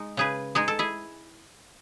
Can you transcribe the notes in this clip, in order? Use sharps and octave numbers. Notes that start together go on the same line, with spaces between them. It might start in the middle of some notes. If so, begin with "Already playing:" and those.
Already playing: G#3 D#4
C#3 G#4 B4
G#3 D#4 G#4
A4
E4 G#4